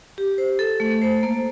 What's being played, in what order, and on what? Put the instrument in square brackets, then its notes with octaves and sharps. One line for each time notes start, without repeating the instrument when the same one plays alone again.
[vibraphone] G4
C5
A4
A3
C5
A#3